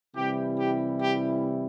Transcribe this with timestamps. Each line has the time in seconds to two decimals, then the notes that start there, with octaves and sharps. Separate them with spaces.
0.15 C3 E3 G3 E4 G4
0.58 G4
1.01 G4